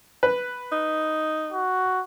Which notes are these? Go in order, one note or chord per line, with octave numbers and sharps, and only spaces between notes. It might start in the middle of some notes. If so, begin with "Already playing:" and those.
B4
D#4
F#4